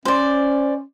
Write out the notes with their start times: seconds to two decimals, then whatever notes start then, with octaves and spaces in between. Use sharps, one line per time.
0.05 C#4 C5 D5